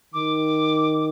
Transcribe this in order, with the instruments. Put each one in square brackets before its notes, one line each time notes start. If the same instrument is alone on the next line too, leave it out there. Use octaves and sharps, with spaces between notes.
[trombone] D#3 [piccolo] D6